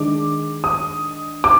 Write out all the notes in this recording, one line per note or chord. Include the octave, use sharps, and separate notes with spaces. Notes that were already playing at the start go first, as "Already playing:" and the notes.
Already playing: D#3 G#3 D4 D6
D#6
D6